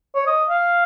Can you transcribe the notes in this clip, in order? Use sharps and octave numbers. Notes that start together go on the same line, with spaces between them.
C#5
D#5
F5